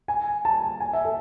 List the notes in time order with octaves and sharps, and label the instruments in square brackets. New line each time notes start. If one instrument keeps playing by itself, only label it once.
[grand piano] G#5
A5
G#5
E5
A4